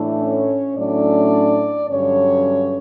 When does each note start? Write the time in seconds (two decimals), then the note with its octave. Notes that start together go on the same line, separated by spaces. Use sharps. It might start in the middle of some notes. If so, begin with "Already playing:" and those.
Already playing: A2 E3 A3 D4
0.20 C#4 C#5
0.77 A2 F#3 A3 C#4 D4 D5
1.90 G2 D3 F#3 C#4 C#5